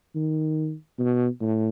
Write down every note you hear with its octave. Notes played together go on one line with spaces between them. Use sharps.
D#3
B2
A2